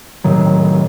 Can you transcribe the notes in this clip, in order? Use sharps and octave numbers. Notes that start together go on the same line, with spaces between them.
A2 C3 D#3 F#3